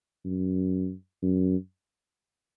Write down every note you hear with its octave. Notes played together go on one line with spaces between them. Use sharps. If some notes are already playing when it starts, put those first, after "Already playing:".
F#2
F#2